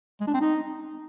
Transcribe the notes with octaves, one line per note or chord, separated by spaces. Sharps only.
G#3
D4
C4
D#4